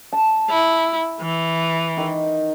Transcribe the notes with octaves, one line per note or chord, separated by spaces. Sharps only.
A5
E4
E3
D#3